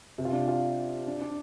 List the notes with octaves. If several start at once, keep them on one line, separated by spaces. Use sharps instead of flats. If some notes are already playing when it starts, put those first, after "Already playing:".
C3
F4
D4
F4
D4
D4